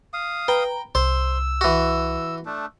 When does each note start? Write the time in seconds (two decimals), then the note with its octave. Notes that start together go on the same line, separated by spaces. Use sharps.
0.14 F5 D#6
0.48 B4 G5 A#5
0.95 C2 C5 E6
1.61 E3 F#4
2.46 A3 D4